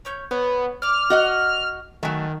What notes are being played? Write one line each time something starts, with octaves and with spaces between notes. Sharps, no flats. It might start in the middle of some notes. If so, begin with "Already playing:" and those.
C#4 C#5 G6
B3 C#5
D5 D6 F6
F#4 D#5 F#5
D#3 F#3 A3 G#5